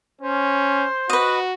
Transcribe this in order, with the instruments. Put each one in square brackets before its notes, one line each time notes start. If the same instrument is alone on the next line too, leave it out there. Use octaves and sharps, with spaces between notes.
[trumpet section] C#4 [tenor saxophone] C5
[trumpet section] F#4 [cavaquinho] B4 D#5